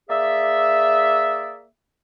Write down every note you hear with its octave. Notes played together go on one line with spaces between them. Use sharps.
A#3 G#4 D5 E5